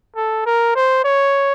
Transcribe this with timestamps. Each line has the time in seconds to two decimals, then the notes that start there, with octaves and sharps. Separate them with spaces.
0.16 A4
0.46 A#4
0.76 C5
1.04 C#5